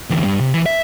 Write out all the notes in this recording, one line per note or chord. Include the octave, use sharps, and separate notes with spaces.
D2 E3
G2
C3
E3
E5